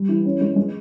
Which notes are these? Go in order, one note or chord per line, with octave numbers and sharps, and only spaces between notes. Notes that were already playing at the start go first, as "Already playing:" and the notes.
Already playing: G3
E3
C#4
G#3
G#3